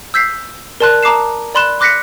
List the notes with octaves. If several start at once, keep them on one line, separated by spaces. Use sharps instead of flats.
E6 G6 B6 C7
A#4 D5 A5 C6 F#6
A5 A#5 D6 D#6 C7 E7
D5 B5 C6 F#6 E7
C6 D6 F#6 A#6 B6 C#7